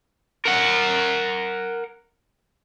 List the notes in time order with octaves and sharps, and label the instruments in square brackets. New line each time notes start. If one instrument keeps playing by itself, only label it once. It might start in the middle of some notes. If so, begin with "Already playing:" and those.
[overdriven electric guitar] A#4 F#5